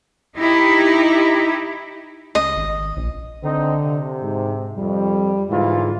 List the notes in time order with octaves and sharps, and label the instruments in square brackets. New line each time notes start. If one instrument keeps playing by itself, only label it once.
[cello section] D#4 E4 G4
[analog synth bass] C#2 [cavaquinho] D#5
[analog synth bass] G#1
A#1
[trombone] D3 [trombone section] C4 D#4
[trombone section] C3
[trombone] G#2
[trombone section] F2 [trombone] G3
[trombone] G#2 [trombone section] D3 E3 F4